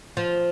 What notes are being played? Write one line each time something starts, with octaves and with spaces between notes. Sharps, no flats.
F3